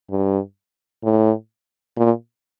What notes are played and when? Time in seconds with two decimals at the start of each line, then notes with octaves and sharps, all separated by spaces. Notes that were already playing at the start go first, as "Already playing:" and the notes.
0.11 G2
1.04 A2
1.97 A#2